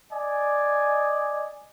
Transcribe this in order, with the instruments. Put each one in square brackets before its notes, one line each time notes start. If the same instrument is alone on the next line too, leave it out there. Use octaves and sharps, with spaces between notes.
[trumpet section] D5 D#5 G#5